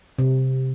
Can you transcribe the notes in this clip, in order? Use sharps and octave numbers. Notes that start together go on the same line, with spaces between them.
C3